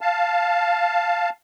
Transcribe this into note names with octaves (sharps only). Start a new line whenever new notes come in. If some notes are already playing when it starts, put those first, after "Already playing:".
F5 A5